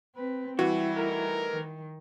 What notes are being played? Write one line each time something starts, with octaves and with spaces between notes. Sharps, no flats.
C4 B4
E3 G3 E4 F#4
A3 D#4 A#4
D#3